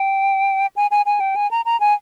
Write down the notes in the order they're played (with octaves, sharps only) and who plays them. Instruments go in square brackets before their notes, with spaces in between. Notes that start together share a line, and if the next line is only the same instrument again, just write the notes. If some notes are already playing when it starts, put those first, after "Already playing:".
Already playing: [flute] G5
G#5
G#5
G#5
G5
G#5
A#5
A#5
G#5